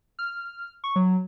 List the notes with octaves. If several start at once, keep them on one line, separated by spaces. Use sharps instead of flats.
F6
C#6
F#3